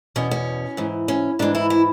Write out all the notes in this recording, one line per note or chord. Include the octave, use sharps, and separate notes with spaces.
E2 B2 C#4
C#4
G#2 E3
C#4
G#2 E3 D4
E4
E4